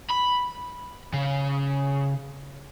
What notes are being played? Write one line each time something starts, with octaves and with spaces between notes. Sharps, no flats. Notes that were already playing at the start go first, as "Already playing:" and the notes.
B5
C#3